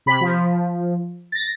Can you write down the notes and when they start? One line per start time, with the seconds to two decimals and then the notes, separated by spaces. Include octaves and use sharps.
0.06 C3 B5 B6
0.21 F3
1.32 A6 A#6